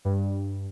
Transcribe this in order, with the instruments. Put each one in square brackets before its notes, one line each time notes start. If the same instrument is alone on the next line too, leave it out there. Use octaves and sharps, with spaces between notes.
[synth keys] G2